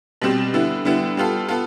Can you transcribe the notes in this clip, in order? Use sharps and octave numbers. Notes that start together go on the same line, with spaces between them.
B2 G3 C4 G4
D3 G3 B3 E4
D3 G3 B3 E4
G3 B3 F4 A4
B3 F4 A4